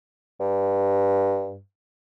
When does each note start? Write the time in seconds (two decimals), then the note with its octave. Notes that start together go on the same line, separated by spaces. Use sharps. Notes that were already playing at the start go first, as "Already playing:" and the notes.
0.40 G2